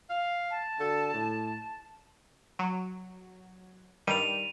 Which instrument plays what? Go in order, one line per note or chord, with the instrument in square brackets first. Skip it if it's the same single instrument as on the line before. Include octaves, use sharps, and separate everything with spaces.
[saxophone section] F5
[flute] A5
[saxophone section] D3 F#4 A4
A2
[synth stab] F#3
[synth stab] G2 D#3 G3 [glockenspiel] D#7 F7